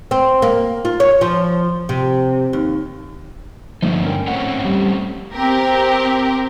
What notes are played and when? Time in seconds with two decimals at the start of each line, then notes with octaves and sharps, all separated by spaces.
0.11 C4
0.42 A#3
0.85 F4
1.00 C#5
1.21 F3
1.89 C3
2.53 D#2
3.82 G2 D3 F3 A3 D#4
4.04 C#4 A#4 G5
4.27 A2 A3 C4 C#4 F#5
4.65 G3
5.33 C4 G4 A#4